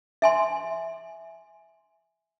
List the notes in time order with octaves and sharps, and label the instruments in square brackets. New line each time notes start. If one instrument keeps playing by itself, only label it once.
[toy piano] E5 G#5 C6